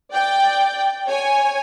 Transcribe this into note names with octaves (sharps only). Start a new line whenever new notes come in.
D5 G5
C#5 G#5